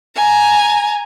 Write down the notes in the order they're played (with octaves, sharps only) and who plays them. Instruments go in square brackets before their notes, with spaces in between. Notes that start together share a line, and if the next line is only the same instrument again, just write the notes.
[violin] G#5 A#5